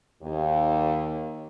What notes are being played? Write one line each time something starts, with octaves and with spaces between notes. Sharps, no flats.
D#2